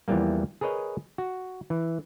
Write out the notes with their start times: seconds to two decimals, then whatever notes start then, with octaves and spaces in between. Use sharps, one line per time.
0.08 E2 E3 F3 G3 A#3
0.61 G#4 A#4 B4 C#5 D#5
1.18 F#4
1.70 E3